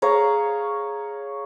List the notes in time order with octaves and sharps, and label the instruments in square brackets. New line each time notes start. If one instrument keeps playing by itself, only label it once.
[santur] G#4 C#5 F5 A#5